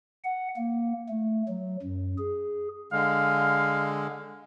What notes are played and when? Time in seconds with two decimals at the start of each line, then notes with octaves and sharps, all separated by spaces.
0.24 F#5
0.57 A#3
1.09 A3
1.49 F#3
1.83 F#2
2.18 G#4
2.92 D3 G#3 F5